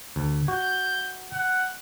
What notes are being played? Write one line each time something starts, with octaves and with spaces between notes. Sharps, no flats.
D2
F#4 G6
F#5